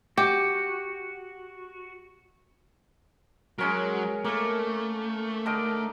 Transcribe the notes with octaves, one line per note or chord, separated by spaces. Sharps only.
F#4 G4
F#3 G#3 C#4 A#4
A3 A#3 A#4
D3 D#4 A#4